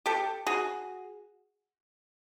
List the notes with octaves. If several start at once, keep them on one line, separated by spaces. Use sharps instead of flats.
G4 A4
F#4 G#4